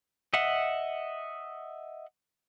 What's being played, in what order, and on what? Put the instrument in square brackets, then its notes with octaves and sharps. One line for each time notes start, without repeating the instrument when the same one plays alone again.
[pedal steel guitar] D#5 E5 F#5